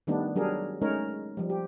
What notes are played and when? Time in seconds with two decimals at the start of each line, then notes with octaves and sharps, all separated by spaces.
0.07 D#3 G3 A3 B3 D4 D#4
0.36 F#3 G3 D4 G#4 A#4
0.81 G#3 A3 C#4 D#4 A#4 C#5
1.37 F3 G3
1.50 G4